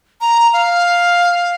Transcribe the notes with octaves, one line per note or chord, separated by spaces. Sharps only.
A#5
F5